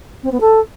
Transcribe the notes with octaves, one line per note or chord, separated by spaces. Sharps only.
C4
B3
A4